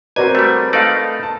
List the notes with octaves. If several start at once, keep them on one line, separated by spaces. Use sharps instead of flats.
C4 F#4 A#4 B4 D5 G#5
G3 A3
A3 D#4 A4 D5 D#5 F5
A5